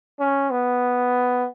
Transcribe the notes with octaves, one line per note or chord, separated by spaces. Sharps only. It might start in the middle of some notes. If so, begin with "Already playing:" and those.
C#4
B3